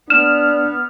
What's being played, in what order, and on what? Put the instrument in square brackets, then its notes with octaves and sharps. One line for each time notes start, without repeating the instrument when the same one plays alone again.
[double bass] B3 [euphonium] D4 [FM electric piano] F6 [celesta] E7